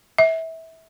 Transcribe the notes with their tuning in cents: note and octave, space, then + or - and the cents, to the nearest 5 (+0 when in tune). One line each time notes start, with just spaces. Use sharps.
E5 -25